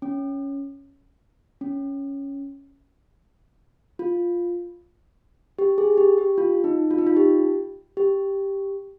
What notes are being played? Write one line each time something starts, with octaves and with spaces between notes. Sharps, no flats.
C#4
C#4
F4
G4
G#4
G4
G4
F4
D#4
F4
D#4
F4
G4
G4